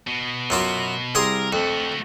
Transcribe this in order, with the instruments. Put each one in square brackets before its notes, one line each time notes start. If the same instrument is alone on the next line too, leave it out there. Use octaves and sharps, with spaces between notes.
[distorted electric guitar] B2
[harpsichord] F#2 F4 F#4
[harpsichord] C2 G#4 C6 [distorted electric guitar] A#4
[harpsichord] F2 [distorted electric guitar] A3 F#4